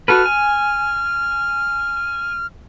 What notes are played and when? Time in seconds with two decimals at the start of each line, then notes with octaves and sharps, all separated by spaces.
0.08 F#4 A4 B4 F6
0.25 G#5